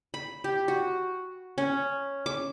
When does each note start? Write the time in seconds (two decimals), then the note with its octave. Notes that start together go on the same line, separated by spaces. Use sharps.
0.14 B5
0.44 G4
0.68 F#4
1.58 C#4
2.26 D6